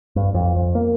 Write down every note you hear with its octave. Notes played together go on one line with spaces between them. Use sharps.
G2
F2
F2
A#3